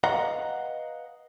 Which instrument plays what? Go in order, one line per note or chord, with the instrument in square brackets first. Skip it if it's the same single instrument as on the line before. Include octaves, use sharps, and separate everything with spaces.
[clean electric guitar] B4 D#5 F5 F#5 A#5